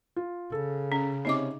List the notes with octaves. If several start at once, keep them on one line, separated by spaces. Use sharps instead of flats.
F4
C#3 A4
C#4
C3 C#4 D#4 D#5 D6